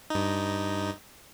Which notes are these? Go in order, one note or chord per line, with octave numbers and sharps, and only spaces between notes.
G2 D#4